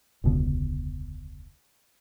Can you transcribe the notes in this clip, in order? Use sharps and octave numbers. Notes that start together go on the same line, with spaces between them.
E1 C#2 B2 D3